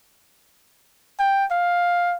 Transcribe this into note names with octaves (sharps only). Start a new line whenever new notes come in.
G5
F5